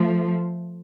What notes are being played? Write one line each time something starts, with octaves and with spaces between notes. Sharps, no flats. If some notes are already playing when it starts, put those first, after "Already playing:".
Already playing: F3 A3